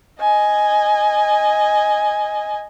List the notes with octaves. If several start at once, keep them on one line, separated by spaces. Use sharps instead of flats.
D#5 G#5